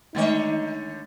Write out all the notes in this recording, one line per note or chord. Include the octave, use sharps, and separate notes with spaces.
D3 D#3 G#3 A3 D#4 C#5 D#5